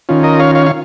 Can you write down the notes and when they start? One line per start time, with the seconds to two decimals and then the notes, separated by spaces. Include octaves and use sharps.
0.09 D#3 C#4 F4
0.23 A#4 D#5
0.40 C#5 F5
0.55 C#5 F5
0.66 F5